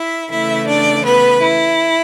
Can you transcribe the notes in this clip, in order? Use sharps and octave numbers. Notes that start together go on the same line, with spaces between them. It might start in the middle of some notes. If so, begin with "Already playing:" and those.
Already playing: E4 E5
C#3 E3 A3 E4 E5
D4 D5
B3 B4
E4